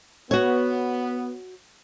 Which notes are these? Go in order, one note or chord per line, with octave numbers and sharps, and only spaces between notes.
B3 F#4 C#5